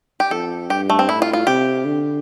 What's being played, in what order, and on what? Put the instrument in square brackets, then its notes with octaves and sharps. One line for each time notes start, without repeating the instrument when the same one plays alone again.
[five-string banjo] G4
[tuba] F2 [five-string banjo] A4
[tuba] G2 [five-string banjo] G4
[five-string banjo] A3
C4
[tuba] A2 [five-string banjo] E4
[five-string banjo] F4
F4
[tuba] C3 [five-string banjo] G4
[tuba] D3